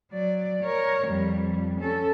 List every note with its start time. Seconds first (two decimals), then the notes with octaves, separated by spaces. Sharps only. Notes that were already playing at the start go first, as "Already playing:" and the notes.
0.12 F#3 D5
0.64 A#4 C#5
1.08 F2 G3
1.80 C#4 A4